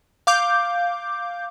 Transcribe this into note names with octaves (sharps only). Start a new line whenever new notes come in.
F5 D6 G6